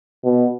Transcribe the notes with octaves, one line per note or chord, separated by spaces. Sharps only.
B2